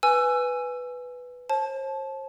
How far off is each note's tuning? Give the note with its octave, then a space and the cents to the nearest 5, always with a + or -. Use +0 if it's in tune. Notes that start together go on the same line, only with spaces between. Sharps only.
B4 +0 G#5 +0 E6 +25
C5 +45 A5 -20